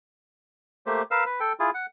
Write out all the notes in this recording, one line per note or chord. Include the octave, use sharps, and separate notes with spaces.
A3 A#3 G4 C5
A#4 B4 F5 E6
B4
A4 G5
E4 F4 G#4
F#5